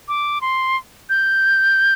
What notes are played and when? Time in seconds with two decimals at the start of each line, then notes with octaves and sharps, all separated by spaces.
0.08 D6
0.41 C6
1.10 G6